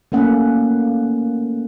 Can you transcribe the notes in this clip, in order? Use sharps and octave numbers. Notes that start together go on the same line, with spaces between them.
A3 A#3 C#4 F#5